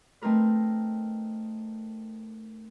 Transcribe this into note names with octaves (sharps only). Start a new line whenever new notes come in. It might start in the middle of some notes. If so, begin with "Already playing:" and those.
A3 C4 D#4 A#4 B4